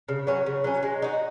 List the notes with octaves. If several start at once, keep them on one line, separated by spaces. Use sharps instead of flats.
C#3
F#3 C#4
C#3
F#3 C#4
G#3
D#4 F#4